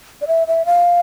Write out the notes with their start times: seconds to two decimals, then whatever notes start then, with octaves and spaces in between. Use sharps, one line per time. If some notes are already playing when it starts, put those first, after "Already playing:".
0.22 D5
0.27 E5
0.47 E5
0.66 F5